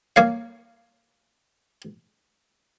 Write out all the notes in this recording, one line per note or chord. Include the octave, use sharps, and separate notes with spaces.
A#3 C#5 F5